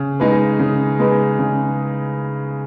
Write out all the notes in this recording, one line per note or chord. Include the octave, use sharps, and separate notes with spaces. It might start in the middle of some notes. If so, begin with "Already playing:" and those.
Already playing: C#3
G#3 D#4 G#4 B4
C#3
G#3 D#4 G#4 B4
C#3